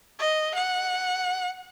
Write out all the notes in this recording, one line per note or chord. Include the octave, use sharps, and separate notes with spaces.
D#5
F#5